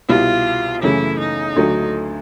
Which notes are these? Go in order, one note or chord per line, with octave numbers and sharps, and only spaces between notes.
C2 B2 G3 F4
F#2 C#3 E3 A3 E4
D#4
D2 D3 F#3 A3